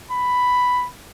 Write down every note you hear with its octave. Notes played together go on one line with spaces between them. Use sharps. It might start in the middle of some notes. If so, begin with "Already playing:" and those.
B5